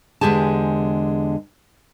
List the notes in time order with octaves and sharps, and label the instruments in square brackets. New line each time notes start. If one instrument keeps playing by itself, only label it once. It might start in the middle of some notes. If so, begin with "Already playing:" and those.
[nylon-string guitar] E2 D3 G#3 G4 G#4 A5